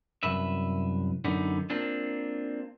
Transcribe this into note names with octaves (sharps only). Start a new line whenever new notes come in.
C2 F#2 B4 E5
F#2 D3 B3 D#4
A#3 C4 D4 F4